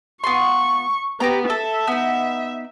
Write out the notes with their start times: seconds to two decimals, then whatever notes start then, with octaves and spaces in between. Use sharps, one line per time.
0.24 B3 F4 C6 C#6
1.20 B3 G4 G5 A#5
1.50 A4 E5
1.87 B3 D#4